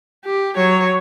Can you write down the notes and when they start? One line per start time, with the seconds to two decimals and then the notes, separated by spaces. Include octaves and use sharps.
0.25 G4
0.57 F#3 C#5